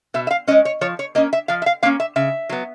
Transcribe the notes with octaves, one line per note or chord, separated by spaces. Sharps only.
B2 E5
E5
F5
G#3 C#4 D#5
C#5
F3 C#5
C#5
A#3 C#4 D#5
E5
F3 F5
E5
F5
A#3 C#4 F5
E5
C#3 E5
F#3 B3